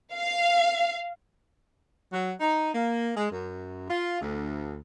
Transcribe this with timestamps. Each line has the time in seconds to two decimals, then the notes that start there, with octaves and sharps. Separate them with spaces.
0.14 F5
2.13 F#3
2.40 D#4
2.73 A#3
3.17 G#3
3.31 F#2
3.89 F4
4.21 D2